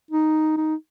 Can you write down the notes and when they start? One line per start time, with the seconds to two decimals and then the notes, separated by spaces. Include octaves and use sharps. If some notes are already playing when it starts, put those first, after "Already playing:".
0.11 D#4
0.57 D#4